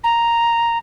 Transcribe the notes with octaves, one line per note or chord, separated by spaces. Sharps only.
A#5